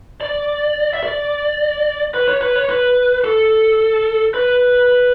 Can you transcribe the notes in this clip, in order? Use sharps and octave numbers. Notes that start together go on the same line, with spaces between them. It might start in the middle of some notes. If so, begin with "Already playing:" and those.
D5
E5
D5
B4
C#5
B4
C#5
B4
A4
B4